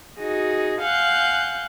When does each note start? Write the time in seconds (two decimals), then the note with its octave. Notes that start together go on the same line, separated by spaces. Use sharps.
0.19 D#4 F#4 G#4
0.80 F5 F#5 G#5 F#6 G6